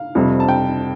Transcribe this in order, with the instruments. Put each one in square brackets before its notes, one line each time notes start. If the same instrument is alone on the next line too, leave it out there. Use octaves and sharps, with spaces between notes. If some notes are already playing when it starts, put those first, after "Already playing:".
Already playing: [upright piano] F5
F2 C3 G3 C4
A5
G5